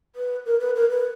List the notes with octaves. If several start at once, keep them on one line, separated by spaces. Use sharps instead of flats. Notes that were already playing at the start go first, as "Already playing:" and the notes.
B4
A#4
B4
A#4
B4